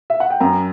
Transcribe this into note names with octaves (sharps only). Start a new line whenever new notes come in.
E5
F#5
G5
F#2 A#5